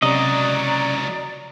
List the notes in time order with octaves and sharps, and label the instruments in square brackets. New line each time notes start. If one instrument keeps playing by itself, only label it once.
[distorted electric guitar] C#2 F#3 [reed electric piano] C3 C#4 [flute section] D5 A#5 [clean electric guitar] D#5